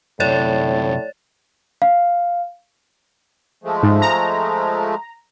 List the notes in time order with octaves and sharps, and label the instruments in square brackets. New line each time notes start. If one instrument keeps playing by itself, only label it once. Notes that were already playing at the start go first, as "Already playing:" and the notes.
[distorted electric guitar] F#2 C3 [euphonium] A2 [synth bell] C#5 D5 A6
[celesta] F5
[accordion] F3 G#3 A3
[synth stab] G#2
A#5